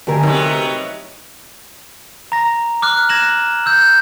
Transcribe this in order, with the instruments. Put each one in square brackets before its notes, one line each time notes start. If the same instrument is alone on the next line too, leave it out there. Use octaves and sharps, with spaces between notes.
[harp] D3 G#5 [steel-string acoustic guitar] A3 G4 A#4
[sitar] C3 F#3 B3 [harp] D#4 G6
[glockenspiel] A#5 A#6
D6 F6 F#6
F#6 G#6 A#6 E7 F#7
E6 G6